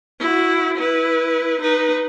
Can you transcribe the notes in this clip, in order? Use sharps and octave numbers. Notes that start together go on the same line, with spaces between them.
E4 F#4
E4 B4
D#4 B4